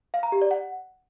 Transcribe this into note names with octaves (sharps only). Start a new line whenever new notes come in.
F5
A#5
G4
D5
F#5